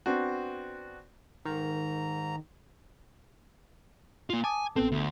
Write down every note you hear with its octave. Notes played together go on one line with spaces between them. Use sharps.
B3 C4 D4 F#4
G#2 D#3 A#5
A#3 F4
G#5 A5 D6 D#6
A1 B3 C4 A4
D2